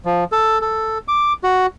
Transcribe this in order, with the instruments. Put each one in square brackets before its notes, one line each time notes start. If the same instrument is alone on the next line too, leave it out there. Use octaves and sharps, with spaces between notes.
[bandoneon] F3
A4
A4
D6
F#4